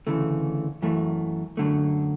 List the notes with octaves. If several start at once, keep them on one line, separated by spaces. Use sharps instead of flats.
D2 C#3 E3 A3
F#2 E3 A3
F#2 D3 A3